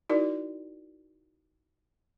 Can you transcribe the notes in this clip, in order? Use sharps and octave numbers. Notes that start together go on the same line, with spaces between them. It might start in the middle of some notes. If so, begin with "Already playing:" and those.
D#4 E4 F#4 A#4 D5